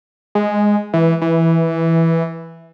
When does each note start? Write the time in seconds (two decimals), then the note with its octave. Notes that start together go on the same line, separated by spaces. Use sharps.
0.35 G#3
0.93 E3
1.22 E3